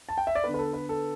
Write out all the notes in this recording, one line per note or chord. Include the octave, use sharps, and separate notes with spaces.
A5
G5
E5
D5
D3 B3 B4
B4
A4
B4
A4